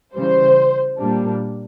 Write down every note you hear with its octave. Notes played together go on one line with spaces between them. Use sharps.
C#3 E3 G3 C5
A#2 G3 A#3 D4